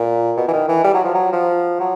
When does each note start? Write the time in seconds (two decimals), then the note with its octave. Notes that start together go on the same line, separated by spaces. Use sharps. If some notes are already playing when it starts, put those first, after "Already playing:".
Already playing: A#2
0.37 B2
0.48 E3
0.53 D#3
0.69 E3
0.84 G3
0.94 F#3
1.04 F3
1.14 F#3
1.32 F3
1.80 F#3